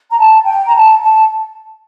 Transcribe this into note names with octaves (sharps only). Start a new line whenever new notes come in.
A#5
A5
G5
A#5
A5
A5